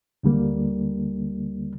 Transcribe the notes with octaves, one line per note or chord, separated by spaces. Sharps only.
D2 D3 G3 A#3